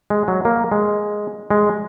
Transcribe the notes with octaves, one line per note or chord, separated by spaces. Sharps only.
G#3
F#3
A#3
G#3
G#3